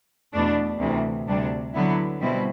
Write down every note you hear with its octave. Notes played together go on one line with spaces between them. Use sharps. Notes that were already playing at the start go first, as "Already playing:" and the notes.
E2 B2 A3 D4
D2 C3 E3
D2 C3 G3 D4
D3 F#3 B3 E4
B2 G3 C4 E4